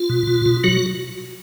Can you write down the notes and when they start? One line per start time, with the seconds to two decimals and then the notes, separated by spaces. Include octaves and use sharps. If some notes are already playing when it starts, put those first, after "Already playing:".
Already playing: F4
0.09 B2
0.27 B2
0.46 B2
0.64 F#3 F#4